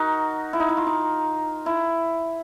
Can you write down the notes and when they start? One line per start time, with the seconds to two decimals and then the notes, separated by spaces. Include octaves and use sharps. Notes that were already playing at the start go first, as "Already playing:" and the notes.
Already playing: D#4 F#4 A#4
0.53 E4
0.60 D#4
0.69 E4
0.77 F4
0.86 D#4
1.66 E4